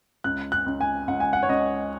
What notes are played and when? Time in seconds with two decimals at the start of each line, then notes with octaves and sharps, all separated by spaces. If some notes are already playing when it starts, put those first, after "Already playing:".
0.24 C#2 F#6
0.52 F#6
0.66 C#2
0.81 G#5
1.08 C#2 F#5
1.20 G#5
1.33 F#5
1.43 C#5
1.49 C#2 D#5